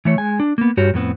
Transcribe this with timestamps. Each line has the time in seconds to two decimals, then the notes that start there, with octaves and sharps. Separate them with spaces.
0.05 E3 A3 C#5
0.18 G#3 G#5
0.40 D4
0.58 A#3 B3
0.77 G2 F#4 G4 C#5
0.94 F2 A2 B3 C4